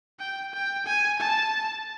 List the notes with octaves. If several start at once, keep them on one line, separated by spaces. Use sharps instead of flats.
G5
G5
G#5
A5